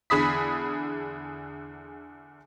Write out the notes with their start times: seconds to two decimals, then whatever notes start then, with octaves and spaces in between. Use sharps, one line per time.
0.10 E2 D3 G#4 B5 D#6 B6